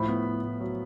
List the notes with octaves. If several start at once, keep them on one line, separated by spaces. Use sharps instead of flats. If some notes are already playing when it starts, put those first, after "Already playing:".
Already playing: A2 F3 B5
B3
A2
A2
F#3